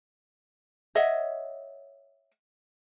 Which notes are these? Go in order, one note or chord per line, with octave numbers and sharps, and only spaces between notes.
C#5 D#5 E5 F#5